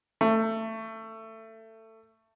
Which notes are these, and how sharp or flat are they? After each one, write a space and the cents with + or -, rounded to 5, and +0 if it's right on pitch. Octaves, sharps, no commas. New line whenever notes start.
A3 +20